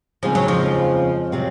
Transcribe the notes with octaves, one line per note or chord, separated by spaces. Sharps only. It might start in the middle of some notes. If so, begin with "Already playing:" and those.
D#2 C#3 F3 G#3 C4 F4
F#3
F2 F3
C3 F#3 C4